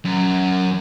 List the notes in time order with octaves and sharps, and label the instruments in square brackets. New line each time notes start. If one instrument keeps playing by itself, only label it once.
[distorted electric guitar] F#2